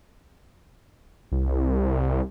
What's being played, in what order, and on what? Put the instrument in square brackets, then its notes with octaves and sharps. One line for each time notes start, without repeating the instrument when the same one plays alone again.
[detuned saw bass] C2